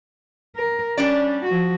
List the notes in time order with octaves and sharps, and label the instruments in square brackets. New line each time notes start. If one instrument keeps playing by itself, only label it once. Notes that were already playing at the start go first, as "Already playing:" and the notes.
[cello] A#4
[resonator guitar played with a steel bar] G3 D4 D5 [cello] C#4
[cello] F3 F#4